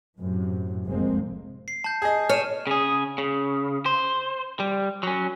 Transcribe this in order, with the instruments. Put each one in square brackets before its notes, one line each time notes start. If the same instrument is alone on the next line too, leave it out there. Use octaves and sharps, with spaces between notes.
[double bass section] F#2 A2 C3
F1 C2 G#3 A#3 C4
[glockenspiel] C7
A5 G6
[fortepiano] G#4 D#5
[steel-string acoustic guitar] C#5 [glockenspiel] F6 D#7 E7
[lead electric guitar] C#3 G#4
C#3
C5
G3
F#3 C#4